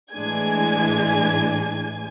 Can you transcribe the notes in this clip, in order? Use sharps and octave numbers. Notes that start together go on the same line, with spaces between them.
A2 E3 G#3 D4 G#5 G#6